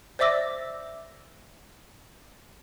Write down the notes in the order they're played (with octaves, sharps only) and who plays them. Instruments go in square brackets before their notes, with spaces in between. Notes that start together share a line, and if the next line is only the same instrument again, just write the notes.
[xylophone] C5 D5 E5 D6 E6 A#6